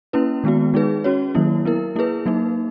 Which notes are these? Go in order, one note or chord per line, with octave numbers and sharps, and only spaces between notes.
A#3 C#4 E4 B4
D#3 G#3 B3 F#4
G#3 D#4 G#4 B4
C#4 F#4 C#5
D#3 F#3 A#3 E4
B3 E4 A#4
A#3 E4 G#4 B4
F#3 A#3 D#4